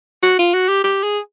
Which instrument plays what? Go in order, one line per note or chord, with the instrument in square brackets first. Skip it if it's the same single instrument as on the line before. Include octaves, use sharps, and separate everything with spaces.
[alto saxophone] F#4
F4
F#4
G4
G4
G#4